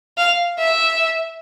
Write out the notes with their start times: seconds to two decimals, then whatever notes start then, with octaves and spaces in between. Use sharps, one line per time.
0.17 F5
0.59 E5